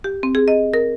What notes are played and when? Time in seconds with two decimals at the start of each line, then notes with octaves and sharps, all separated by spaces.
0.04 G4
0.23 C4
0.35 G#4
0.48 D#5
0.74 A#4